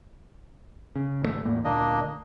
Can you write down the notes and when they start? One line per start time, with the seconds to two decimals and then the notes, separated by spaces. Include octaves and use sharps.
0.96 C#3
1.22 G#1 C#3 A3
1.45 E2 A2 A#3
1.65 D2 A#2 A#3 D4 D#5